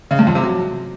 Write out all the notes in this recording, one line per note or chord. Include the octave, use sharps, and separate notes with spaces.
C#3
G2
F2
C3
F#3